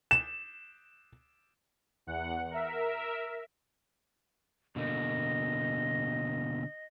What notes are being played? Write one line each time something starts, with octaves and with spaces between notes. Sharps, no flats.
E7
E2 F#5
A#4 E5
B2 D3 A#3 D#5